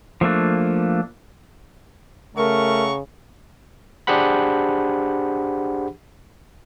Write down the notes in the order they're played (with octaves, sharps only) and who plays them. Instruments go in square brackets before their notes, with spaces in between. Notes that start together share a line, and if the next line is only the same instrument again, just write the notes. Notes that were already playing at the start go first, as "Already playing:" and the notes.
[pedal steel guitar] F3 A3 A#3 D4
[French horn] C#3 [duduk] A3 [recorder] A#4 [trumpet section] F#5 A#5 C#6
[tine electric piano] D4 G4 G#4 C5 F#5 B5